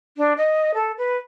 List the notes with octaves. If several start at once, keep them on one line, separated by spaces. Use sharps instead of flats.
D4
D#5
A4
B4